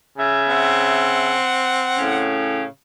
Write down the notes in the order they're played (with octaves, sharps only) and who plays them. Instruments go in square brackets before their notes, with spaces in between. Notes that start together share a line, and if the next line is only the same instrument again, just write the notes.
[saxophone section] C#3 E5
[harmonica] C4 F#5
[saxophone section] A2 C#3 C#4